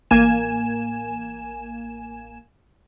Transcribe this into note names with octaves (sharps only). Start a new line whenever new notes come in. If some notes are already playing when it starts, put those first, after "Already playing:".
A1 A#3 G#5 E7